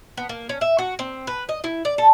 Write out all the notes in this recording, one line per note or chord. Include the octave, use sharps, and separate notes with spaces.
B3
A#3
C#4
E5
F#4
C4
B4
D#5
E4
D5
A4